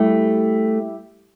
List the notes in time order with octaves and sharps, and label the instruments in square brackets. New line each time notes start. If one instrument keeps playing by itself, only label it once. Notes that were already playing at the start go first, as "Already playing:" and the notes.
Already playing: [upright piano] G3 E4 G4 [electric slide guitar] A3